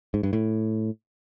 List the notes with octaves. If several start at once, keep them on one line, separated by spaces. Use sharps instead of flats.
G#2
G2
A2